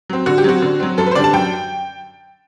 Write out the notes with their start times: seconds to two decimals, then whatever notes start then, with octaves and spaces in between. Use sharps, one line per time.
0.10 F#3 C4
0.26 D3 F#4
0.38 G4
0.44 F#3 C4 F#4
0.62 D3
0.80 F#3 C4
0.98 F#2 A4
1.07 B4
1.11 C5
1.15 D3 G3 D4 D5
1.24 A5
1.33 F#2 G5